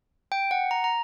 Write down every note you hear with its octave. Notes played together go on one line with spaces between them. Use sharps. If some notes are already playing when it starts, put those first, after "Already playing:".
G5
F#5
A#5
A#5